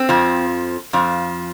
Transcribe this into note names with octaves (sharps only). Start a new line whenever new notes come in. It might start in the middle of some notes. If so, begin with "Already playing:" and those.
Already playing: C4
F2 F3
F2 F3